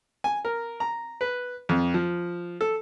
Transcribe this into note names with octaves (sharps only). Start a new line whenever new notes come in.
G#5
A#4
A#5
B4
F2
F3
A4